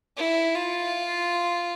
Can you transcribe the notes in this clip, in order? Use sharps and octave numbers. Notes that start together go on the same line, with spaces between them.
E4
F4